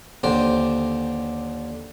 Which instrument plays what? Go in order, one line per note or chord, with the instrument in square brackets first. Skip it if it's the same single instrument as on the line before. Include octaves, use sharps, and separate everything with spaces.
[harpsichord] D#2 D3 C5 G5